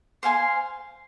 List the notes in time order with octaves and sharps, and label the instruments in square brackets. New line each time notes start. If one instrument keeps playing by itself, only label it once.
[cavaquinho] C5 F5 G#5 C6